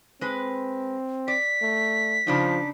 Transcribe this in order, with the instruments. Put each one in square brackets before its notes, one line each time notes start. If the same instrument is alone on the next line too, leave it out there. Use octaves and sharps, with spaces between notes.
[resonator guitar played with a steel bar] G#3 B4 [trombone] C4
[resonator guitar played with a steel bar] D5 [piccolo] B6
[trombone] A3
[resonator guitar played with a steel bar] C#3 D4 D#4 [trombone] F3